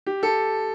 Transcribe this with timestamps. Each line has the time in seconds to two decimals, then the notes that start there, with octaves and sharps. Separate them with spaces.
0.06 G4
0.23 A4